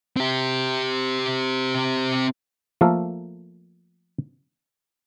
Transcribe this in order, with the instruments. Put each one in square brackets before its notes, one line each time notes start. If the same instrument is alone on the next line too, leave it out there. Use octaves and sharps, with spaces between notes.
[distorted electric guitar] C4 G4
[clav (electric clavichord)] F3 A3 A#3 A4 A#4